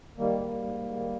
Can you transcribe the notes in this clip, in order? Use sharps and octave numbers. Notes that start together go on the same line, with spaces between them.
D#3 G3 A#3
G#2
G#2
G#2
G#2
D#3